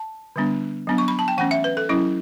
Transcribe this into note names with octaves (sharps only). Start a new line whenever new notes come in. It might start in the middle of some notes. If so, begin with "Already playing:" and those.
Already playing: A5
D3 G3 B3 D4
F#3 B3 D4
C#6
B5
A5
G5
E3 A3 C#4 F#5
E5
B4
A4
F#3 C#4 E4